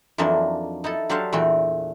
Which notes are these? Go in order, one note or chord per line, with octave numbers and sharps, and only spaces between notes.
F2 E3 F#3 A#3 D4 D#4
D#4 E4 A4
F#3 D4 G4 A4 C5 F5
E2 A#2 E3 A3 F#4 G5